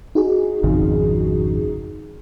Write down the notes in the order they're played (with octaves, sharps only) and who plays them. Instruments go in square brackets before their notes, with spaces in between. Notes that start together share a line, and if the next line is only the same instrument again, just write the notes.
[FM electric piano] D#4 F#4 G#4
[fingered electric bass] G#1 F2 C#3